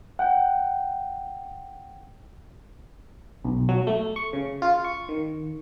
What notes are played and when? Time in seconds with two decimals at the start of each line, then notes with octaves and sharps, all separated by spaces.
0.19 F#5 G5
3.45 B1
3.69 F#3
3.87 A3
4.16 C#6
4.33 C#3
4.62 F4
4.84 C#6
5.09 D#3